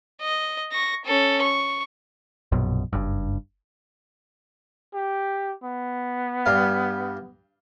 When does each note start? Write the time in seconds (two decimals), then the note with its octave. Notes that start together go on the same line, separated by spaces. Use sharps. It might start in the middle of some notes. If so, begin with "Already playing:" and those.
0.21 D#5
0.72 C#6 A#6
1.05 C#4 A4
1.42 C#6
2.52 A#1 F#2 B2
2.93 F#1 G2
4.94 G4
5.64 B3
6.46 G2 F5